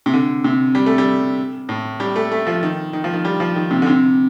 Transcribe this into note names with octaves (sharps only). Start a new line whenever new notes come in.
C3
D3
C3
G3
A3
G3
A2
G3
A3
A3
F3
D#3
D#3
F3
D#3
G3
F3
D#3
C3
D3
C3